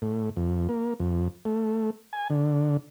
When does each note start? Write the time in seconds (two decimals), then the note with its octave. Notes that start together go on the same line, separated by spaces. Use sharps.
0.02 A2
0.37 F2
0.69 A#3
1.00 F2
1.45 A3
2.13 G#5
2.30 D3